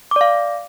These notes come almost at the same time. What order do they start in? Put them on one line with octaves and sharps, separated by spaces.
D6 D5 F5